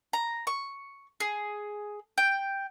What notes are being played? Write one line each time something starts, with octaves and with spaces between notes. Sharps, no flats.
A#5
C#6
G#4
G5